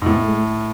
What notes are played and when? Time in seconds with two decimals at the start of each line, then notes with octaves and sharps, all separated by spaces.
0.02 G#2
0.06 A2 B3
0.16 A3
0.27 G#3
0.38 A3